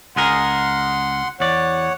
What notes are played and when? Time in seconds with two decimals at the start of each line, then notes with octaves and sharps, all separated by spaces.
0.16 C#2 G#4 A#4 F#5 C6
1.40 E2 C#5 D5 F#5